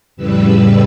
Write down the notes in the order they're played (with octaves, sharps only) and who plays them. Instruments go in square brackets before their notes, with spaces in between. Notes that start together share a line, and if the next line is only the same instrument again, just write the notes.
[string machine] F2 A2 C#3 G3 B4 E6